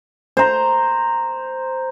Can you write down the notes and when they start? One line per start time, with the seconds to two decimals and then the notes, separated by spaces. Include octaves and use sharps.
0.37 C5 A#5